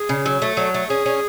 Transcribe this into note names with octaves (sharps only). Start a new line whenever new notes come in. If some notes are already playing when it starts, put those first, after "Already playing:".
Already playing: G#4
C#3
F#3
A3
F#3
A3
C#4 G#4
C#4